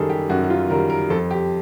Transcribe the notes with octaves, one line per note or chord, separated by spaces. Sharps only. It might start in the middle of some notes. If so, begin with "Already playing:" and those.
Already playing: F#2 D#3 G3 G#4 A4
G4
F#2 F#4
F#4
F4
D#3 G3 A#4
A#4
F2 A4
G4